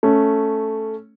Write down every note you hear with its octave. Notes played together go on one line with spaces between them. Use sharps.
A3 C#4